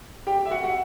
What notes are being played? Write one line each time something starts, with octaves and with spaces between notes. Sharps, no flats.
G4 G5
E5
F#4 F#5
F#5